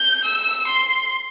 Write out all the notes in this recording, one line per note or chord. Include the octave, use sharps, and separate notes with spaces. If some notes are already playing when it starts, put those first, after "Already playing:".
Already playing: G6
E6
C6